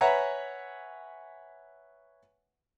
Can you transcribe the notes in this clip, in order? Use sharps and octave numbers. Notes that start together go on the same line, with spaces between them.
B4 C#5 E5 F#5 G#5 A#5